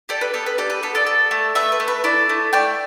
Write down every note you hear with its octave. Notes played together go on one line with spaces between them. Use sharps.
G4 A4 D5
B4
B3 A4
B4
G4 A4 D5
B4
B3 A4
A4 D5
A4
A3
A3 B4 E5
B4
A3
B4
E4 A4 D5
A3
A3 D5 G5